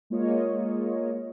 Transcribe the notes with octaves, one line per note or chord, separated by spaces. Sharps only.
G#3 A#3 F4 C#5 D#5